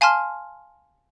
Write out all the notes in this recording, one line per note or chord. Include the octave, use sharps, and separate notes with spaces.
F5 G#5 A5 C6 F6